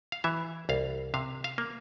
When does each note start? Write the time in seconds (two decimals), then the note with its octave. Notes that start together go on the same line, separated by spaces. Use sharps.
0.12 F5
0.24 E3 E5
0.69 C2 F5
1.14 C3 F5
1.44 F5
1.58 A#3